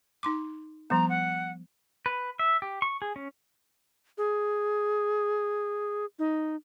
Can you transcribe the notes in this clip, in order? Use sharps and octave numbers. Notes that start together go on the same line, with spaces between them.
D#4 C6 D6
F3 G3 B3 A#5
F#5
B4
E5
G4
C#6
G#4
C#4
G#4
D#4